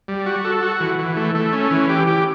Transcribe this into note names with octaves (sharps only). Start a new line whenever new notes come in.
G3
F#4
A4
F#4
E3
E3
A3
A3
C#4
E3
G4
G4